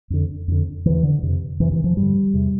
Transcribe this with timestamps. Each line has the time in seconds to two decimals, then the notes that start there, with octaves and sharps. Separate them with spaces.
0.10 F2 D3
0.48 F2 D3
0.85 E2 D3 E3
1.03 D3
1.23 F2 C3
1.60 F2 C3 E3
1.72 E3
1.84 F3
1.97 G2 G3
2.02 D3
2.34 E2 C3